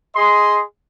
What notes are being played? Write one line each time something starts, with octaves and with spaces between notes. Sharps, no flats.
G#4 D#5 C6